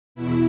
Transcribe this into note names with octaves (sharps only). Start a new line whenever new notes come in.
E2 B2 E4